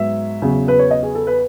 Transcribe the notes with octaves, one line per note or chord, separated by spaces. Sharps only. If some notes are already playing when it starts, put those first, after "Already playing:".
Already playing: G#2 F#3 B3 E5
E2 C#3 F#3
B4
C#5
D#5
G#4
A4
B4